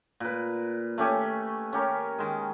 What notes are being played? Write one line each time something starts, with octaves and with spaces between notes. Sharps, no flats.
A#2 B4
A3 C#4 G4 G#5
C#4 G4 A#4
D#3 G#3